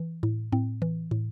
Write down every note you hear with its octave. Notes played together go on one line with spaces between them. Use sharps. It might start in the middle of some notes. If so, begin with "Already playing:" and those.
Already playing: E3
A2
A2 C4
E3
A2